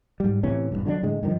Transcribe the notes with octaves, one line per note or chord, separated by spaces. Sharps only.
G#2 G3
A2 C3 E3 C#4
E1 C2 G2
D3 F#3 G#3 D4
A2 D3 G#3
G2 D3 D#3 F3